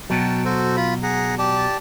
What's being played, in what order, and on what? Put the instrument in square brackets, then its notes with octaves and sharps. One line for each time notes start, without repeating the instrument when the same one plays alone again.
[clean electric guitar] B2 F#3 [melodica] G5 A5
[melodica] F#4 A4 C5
F4 B5
G#4 F#5 A#5
G4 D5 A5